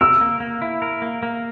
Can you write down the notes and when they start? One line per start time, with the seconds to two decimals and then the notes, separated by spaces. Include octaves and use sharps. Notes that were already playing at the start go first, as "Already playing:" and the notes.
0.01 A#4 E6
0.21 A#3
0.40 A#3
0.62 E4
0.82 A#4
1.02 A#3
1.23 A#3